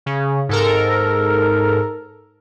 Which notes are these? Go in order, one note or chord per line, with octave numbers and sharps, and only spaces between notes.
C#3
G#2 A4 A#4